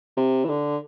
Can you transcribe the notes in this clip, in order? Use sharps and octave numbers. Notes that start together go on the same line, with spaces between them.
C3
E3
D3